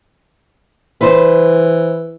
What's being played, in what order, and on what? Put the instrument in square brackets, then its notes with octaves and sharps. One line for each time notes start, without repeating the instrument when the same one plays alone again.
[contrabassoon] E3 [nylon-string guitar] B4 C5